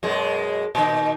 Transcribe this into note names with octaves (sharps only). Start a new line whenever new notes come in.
F#2 B2 G#3
A#2 D#3 D#4